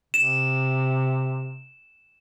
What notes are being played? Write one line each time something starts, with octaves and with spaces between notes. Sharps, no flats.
C3 E7